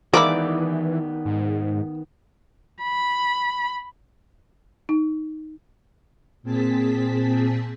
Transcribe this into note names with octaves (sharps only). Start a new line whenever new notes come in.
D#3 E3 G#3 A#3 B3 E4 D5 D6
G#2
B5
D#4
A#2 C4 G#4 A5 B6